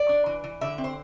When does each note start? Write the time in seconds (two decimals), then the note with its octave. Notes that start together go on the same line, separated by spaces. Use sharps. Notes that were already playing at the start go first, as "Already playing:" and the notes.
Already playing: D5
0.09 D4
0.26 E3
0.44 E3
0.61 D3 E5
0.78 C4
0.84 C5